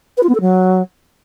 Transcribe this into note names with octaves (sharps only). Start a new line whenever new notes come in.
B4
F4
B3
A4
F#3